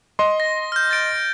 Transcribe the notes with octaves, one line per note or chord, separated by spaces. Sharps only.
D#5 C6
A#6
F6 G6
A6 D7